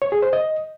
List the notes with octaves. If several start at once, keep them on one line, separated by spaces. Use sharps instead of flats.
C#5
G#4
C5
D#5